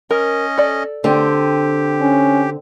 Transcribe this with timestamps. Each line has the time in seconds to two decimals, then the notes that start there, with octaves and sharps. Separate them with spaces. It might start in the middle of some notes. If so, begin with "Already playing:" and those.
0.11 C#4 A#4 D#5
0.58 A4 D5
1.04 D3 C4 G4
2.01 C#4